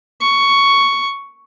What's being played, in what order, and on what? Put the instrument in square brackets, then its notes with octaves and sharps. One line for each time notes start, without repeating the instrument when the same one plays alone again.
[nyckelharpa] C#6